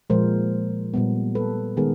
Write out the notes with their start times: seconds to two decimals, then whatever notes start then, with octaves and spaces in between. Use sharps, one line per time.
0.10 A#2 F3 G#3 A#4 C5
0.94 A#2 G3 B3
1.35 A4 B4
1.77 D#3 G#3 B3 G#4 A#4